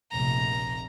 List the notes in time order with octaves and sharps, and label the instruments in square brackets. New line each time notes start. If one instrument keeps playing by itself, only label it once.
[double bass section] F1 A#1 [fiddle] A#5